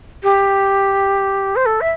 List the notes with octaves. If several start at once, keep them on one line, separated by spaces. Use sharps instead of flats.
G4
C5
A4
E5